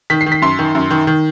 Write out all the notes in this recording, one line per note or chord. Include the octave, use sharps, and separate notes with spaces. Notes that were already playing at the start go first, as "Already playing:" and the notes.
D#3 B6
C7
D#3
B6
F#2 C6
D#3
F#2
D#3
D#3